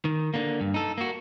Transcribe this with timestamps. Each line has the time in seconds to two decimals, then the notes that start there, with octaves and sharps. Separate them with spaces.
0.05 D#3
0.34 D3 A#3
0.61 G2
0.74 D#4 A4
0.98 A#3 F#4